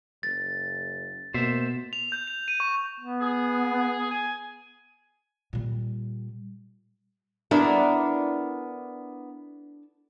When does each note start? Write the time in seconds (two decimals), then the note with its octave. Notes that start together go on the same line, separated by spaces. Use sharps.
0.23 F#1 A6
1.34 B2 A#3 C5 E5
1.93 F7
2.12 G6
2.27 F7
2.48 D#7
2.60 C#6
3.00 B3
3.21 G#4
4.11 G#5
5.53 A#2 G3
7.51 B3 D4 E4 A4 A#4